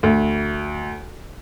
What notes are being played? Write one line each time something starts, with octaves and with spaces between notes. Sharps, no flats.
D2